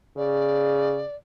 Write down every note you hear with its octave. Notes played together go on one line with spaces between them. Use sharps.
C#3 D5